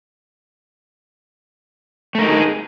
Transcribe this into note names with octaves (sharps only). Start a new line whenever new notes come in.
A3 D#4 G4 G#4 A#4